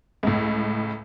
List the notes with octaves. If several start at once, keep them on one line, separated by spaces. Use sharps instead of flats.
C#2 A2